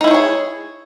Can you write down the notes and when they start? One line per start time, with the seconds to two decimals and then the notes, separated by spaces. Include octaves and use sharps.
0.01 D#4
0.04 E4
0.08 C5
0.11 C#5
0.14 G#4